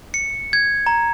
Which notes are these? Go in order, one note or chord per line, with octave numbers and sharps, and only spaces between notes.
C#7
G#6
A#5